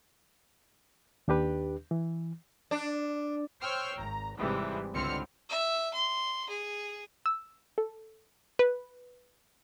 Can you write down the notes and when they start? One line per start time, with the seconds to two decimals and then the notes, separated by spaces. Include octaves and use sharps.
1.28 D#2 D4 G4 B4
1.91 E3
2.71 D4
3.61 C5 C#5 G5 E6 F6 C7
3.96 G#1 A#5
4.38 G#1 G#2 C3 E3 G3 G#3
4.93 C#2 D3 C4 E4 F6 C#7
5.49 E5
5.93 C6
6.49 G#4
7.26 E6
7.78 A4
8.59 B4